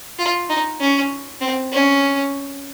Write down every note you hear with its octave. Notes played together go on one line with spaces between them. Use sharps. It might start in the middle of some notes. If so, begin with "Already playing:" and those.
F4
D#4
C#4
C4
C#4